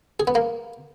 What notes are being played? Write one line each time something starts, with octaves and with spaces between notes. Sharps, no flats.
G#4
B3
A#3